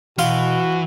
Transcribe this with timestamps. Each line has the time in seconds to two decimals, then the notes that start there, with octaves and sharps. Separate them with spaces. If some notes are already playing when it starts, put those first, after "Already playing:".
0.19 B2 E3 F#4 F5 C6